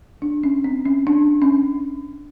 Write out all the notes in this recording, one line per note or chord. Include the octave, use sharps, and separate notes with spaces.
D4
C#4
C4
C#4
D4
C#4